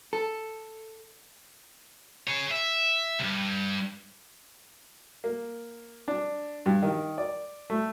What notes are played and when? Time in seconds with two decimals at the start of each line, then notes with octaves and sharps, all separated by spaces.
0.13 A4
2.27 G#4 C#5
2.51 E5
3.20 C#2 G2
5.24 A#3
6.08 D4
6.66 G2
6.82 D#3
7.18 D5
7.70 A3